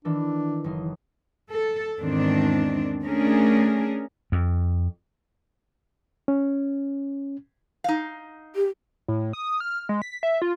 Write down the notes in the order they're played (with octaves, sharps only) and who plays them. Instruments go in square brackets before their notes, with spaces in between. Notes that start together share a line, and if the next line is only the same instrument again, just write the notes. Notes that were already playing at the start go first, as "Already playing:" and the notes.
[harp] D#3 E3 A4 [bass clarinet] D4
[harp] F#1 D#4 C6
[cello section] A4
E2 G#2 D#3 C4 D4
A3 C#4 D4 G#4 A#4
[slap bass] F2
[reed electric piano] C#4
[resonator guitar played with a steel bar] D#4 F5
[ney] G4
[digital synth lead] A2
D#6
F6
G#3
B6
E5
F4